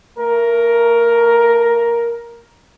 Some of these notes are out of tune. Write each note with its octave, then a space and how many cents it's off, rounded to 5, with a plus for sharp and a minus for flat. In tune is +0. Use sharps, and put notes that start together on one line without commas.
A3 +40 A#4 +10